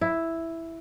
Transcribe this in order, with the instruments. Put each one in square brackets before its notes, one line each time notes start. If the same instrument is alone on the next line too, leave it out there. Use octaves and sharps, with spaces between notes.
[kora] E4